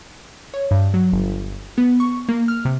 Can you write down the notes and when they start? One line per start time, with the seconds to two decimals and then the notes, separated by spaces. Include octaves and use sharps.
0.54 C#5
0.71 G2
0.94 F#3
1.12 G1
1.78 B3
2.00 C#6
2.29 A#3
2.48 F6
2.65 C3